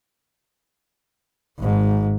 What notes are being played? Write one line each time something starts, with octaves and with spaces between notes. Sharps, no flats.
G#1 G#2